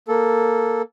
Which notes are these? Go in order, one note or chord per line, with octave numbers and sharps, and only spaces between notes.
A#3 A4